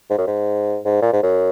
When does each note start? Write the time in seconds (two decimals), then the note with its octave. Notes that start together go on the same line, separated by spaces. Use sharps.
0.10 G#2
0.18 F#2
0.27 G#2
0.85 G#2
1.02 A#2
1.13 G#2
1.23 F#2